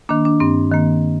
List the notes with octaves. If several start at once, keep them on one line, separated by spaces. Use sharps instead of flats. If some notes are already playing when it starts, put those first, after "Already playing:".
D#3 A#3 D4
D4
G2 C4
D#3 A#3